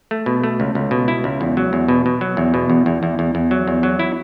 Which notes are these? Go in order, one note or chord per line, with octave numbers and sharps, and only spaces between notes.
A3
B2
A3
C#2
C#2
B2
E4
C#2
E2
F#3
E2
B2
B2
F#3
E2
B2
E2
E2
E2
E2
E2
F#3
E2
F#3
E4